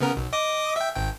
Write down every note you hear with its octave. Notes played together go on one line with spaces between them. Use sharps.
C#3 B3 A#4
B1
D#5 D6 D#6
E5 G5
G#1 G5